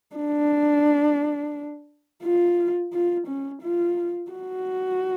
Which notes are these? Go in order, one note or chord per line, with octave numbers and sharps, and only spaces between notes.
D4
F4
F4
C#4
F4
F#4